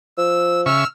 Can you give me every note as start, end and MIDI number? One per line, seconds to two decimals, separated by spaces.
0.18 0.66 53
0.18 0.61 88
0.66 0.84 49
0.66 0.84 76
0.66 0.84 85
0.66 0.87 88
0.66 0.87 89